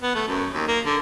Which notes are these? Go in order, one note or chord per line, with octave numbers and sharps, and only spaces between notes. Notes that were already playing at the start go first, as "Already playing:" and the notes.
B3
A3
F#2
D#2
A#3
D3